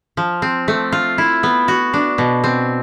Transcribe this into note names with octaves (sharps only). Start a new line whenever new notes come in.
F3
C4
A3
F4
E4
B3
F#4
D4
B2
C4